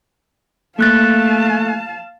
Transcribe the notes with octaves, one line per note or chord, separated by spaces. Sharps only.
A3 A#3 F5 A5 F#6 A6